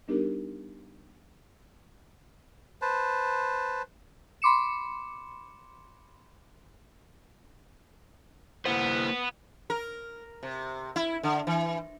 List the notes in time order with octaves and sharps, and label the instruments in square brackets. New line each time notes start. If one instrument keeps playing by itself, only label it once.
[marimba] G3 B3 D4 D#4 G4 A#4
[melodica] B4 C5 A5
[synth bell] B5 C6 D6 C#7 E7
[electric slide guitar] A#3 E4 C5 [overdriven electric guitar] B4 F#5
[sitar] A#4
C3
E4
D3
E3